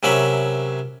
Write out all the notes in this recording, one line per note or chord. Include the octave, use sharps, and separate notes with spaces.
C3 F#3 C#4 A#4 E5 B5